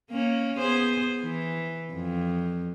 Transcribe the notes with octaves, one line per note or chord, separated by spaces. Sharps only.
A#3 C#4
B3 G#4 C5
E3
F2